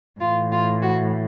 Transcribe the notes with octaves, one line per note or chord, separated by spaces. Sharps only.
A2 E3 F4
F4
F#4